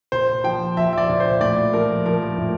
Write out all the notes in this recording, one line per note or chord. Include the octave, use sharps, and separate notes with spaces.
A#2 C5
F3 G5
F3 E5
E5
D5
A#2
C5
A2 D5
F3 A#4
F3 A#4
A2